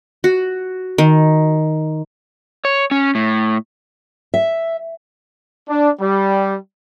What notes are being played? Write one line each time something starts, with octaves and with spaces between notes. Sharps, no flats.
F#4
D#3
C#5
C#4
A2
E5
D4
G3